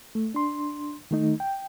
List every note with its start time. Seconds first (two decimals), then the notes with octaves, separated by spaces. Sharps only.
0.15 A3
0.34 D4 C6
1.11 D#3 A3 D#4
1.40 G5